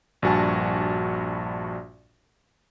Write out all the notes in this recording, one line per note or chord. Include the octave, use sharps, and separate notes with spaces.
A#1 G2 F#4 G#5 A5